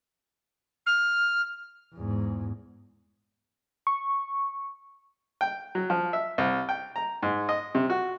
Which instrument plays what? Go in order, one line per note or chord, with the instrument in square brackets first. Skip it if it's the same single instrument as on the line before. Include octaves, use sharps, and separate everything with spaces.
[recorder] F6
[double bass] E2 G#2
[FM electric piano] C#6
[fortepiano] G5
F#3
F3
E5
C2
G5
A#5
G#2
D#5
C3
F#4